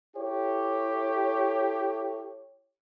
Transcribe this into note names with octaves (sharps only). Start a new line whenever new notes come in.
E4 G4 A4 C#5